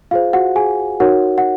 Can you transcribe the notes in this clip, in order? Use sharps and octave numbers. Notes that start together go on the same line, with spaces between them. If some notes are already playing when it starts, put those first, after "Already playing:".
F4 G#4 C5 F5
F#4 F#5
G#4 G#5
D#4 F#4 A#4 C#5 F#5
F#5